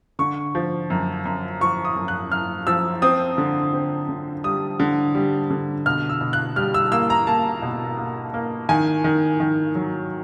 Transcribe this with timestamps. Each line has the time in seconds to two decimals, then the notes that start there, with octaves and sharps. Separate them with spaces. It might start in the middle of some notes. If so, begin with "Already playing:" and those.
0.19 D3 C#6
0.55 F3
0.90 F#2
1.25 F#2
1.61 F3 C#6
1.85 D#6
1.96 F#2
2.08 F#6
2.31 F#2 F6
2.67 F3 E6
3.02 C4 D#6
3.38 D3
3.73 C4
4.09 D3
4.44 G3 D#6
4.80 D3
5.15 G3
5.50 D3
5.86 B2 F6
6.09 E6
6.21 B2
6.33 F#6
6.56 G3 F6
6.74 E6
6.92 A#3 E6
7.10 A#5
7.27 A#3 A5
7.62 B2
7.98 A#3
8.34 A#3
8.69 D#3 G#5
9.04 D#3
9.40 D#3
9.75 F#3